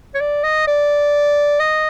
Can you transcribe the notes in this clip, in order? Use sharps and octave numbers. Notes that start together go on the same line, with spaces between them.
C#5
D5
D#5
D5
D#5